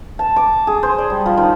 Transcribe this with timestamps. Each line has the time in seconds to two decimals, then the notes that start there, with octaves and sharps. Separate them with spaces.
0.19 A5
0.36 D6
0.67 G#4
0.83 C5
0.98 D5
1.10 G3
1.26 F3
1.38 D#3